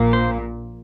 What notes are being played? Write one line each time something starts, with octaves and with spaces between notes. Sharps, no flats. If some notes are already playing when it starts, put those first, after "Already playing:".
Already playing: A#1 A#2 A#3
C5